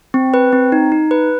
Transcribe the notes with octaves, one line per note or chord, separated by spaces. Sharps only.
C4
B4
C4
D#4
D#4
B4